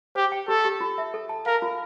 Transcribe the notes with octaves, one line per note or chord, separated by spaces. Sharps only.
G4 C5
G5
G4 A4
G4
F4
E5
A4
A5
A#4 F5
F4